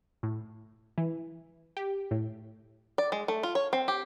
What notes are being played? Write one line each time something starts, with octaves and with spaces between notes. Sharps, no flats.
A2
E3
G4
A2
D5
G#3
A3
F4
C#5
C4
G4